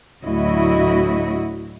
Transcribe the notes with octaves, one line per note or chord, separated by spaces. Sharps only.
D2 A2 F#3 E4 F#4 D#5